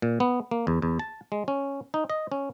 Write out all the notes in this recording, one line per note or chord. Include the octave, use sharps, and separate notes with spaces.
A#2
B3
A#3
E2
E2
A5
G#3
C#4
D#4
D#5
C#4